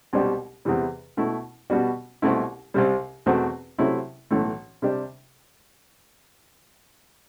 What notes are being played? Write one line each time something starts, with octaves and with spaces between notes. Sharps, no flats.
C2 B2 G3 D4 G4
E2 C3 E3 G3
B2 A3 E4
B2 G3 B3 D4 F#4
C2 B2 A3 E4
C2 C3 G3
E2 B2 A3 C4 F#4
C3 F#3 A3 E4
B1 A2 E3 A3
C3 G3 D4 G4